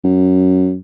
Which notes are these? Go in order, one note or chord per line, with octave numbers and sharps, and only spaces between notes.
F#2